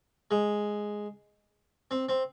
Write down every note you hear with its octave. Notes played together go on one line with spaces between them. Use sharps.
G#3
C4
C4